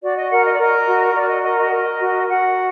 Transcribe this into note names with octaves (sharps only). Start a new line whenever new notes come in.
F#4 D5
D#5
A#4 F#5
D#5
D5
A#4 D#5
F#4
F#4 D5
D#5
A#4 D#5
D#5
A#4
F#4
F#4 F#5